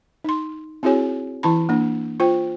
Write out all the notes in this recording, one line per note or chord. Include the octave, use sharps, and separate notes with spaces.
D#4 C6
C4 E4 F#4 G#4 C#5 G#5
E3 E4 A5 B5
A#3 D4
F4 C5 G5